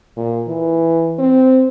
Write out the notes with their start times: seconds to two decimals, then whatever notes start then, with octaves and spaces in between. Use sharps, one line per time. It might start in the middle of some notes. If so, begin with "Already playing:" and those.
0.17 A#2
0.48 E3
1.19 C4